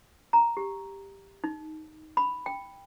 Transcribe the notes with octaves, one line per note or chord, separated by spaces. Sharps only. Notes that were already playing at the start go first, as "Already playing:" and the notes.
A#5
G4
D#4
B5
G5